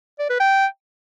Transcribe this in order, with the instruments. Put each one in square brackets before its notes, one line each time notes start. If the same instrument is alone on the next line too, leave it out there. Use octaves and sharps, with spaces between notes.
[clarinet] D5
B4
G5